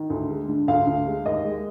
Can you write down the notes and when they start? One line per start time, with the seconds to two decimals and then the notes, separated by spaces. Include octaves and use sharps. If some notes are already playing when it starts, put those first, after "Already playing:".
Already playing: D#3
0.10 D2
0.29 G#3
0.48 D3
0.68 D2 F5
0.87 D2
1.06 G#3
1.26 D#2 D#5
1.45 G#3